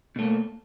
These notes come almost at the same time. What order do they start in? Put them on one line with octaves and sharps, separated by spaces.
B2 A3 A#3